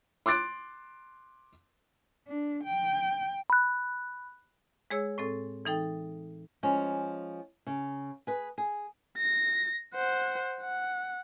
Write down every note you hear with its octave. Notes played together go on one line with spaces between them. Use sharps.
C6 D6 F#6 A6 D7
D4
G5
B5 F#6
G#3 G#4 C#5 E6
A2 C4 A4
E3 D#4 A4 G5
F3 G#3 C#4
C#3
G#4 B4
G#4
A#6
C5 F#5
F#5